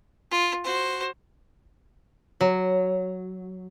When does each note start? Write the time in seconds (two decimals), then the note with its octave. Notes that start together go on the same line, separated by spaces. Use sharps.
0.31 F4
0.64 F#4 C5
2.41 F#3